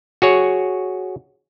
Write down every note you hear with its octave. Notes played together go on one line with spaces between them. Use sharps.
F#4 G#4 C#5